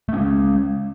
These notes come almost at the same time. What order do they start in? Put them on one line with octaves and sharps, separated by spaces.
A3 C#4 G#3